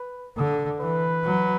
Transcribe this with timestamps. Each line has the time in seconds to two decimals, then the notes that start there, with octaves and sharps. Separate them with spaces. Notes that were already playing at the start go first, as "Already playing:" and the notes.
Already playing: B4
0.37 D3
0.80 E3 B4
1.24 F#3